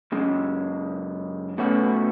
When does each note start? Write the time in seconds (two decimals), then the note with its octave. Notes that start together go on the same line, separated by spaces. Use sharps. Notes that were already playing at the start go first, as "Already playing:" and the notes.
0.12 F#2 C#3 G#3
1.58 B2 A3 C#4 F#4